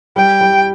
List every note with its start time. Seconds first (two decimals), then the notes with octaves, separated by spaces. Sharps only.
0.16 G3 G5
0.41 G3